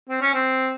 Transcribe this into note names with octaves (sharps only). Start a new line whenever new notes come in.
C4
C#4
C4